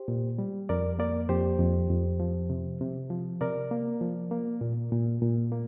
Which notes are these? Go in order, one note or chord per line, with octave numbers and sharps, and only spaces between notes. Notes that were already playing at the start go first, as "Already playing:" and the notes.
Already playing: G4 C5
A#2
G3
F2 A#4 D5
A#3 A#4 D5
F2 G4 C5
F2
F2
F3
C3
C3
F3
C3 A#4 D5
A#3
F3
A#3
A#2
A#2
A#2
A#3